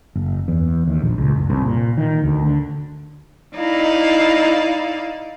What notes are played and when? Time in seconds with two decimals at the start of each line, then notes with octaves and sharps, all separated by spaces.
0.15 F#1
0.48 E2
0.87 D#2
1.02 A#1
1.18 C#2
1.36 F#1
1.50 C2
1.63 A#2
1.98 D#3
2.23 D2
2.42 D3
3.56 D#4 E4 D5 F5